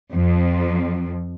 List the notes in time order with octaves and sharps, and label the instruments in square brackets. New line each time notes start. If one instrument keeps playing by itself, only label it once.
[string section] F2